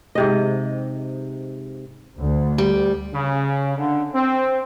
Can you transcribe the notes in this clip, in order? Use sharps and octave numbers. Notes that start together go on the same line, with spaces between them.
G#2 C3 D#5
D2
G3
C#3
D3
C4